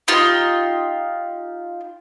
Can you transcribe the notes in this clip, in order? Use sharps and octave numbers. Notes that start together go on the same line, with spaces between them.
D#4 F4 G4